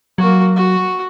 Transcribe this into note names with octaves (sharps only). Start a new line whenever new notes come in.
F#3 A#3 F#4
F#4